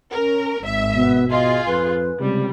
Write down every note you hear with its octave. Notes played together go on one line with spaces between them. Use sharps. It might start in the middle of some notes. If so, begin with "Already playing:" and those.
C#4 A#4
G#1 E5
B2 B3
F4 G#4 D#5
F2 B4
C#2 C3 G3